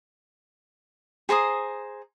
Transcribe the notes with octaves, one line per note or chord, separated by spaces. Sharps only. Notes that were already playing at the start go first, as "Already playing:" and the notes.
G#4 C5 A#5 D#6